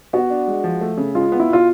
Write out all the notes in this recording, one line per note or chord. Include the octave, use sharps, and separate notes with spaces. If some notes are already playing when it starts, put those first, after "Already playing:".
B3 F#4
D4
G#3
F3
A3
C#3
G#3 F4
B3
E4
B2 F4